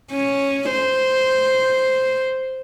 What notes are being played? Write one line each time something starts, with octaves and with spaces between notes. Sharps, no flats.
C#4
C5